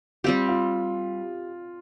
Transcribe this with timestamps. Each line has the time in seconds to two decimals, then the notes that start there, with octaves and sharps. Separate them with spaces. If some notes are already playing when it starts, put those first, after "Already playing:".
0.24 G3 C4 F4 G4
0.49 F4